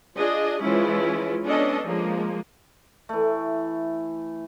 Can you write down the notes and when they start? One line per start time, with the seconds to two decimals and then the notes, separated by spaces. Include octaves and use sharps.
0.17 D4 F4 G#4 D#5
0.62 E3 F3 G#3 C#4 E4 F4
1.44 B3 C#4 D4 A4 D#5
1.86 F3 G#3 A#3
3.09 E3 A3